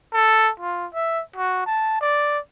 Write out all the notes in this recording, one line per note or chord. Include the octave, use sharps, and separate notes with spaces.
A4
F4
E5
F#4
A5
D5